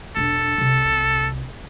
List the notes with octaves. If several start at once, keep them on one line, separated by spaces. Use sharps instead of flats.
E1 D4 A4
C2 C3